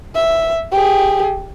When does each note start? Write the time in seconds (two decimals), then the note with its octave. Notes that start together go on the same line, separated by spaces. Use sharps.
0.15 E5
0.72 G4 G#4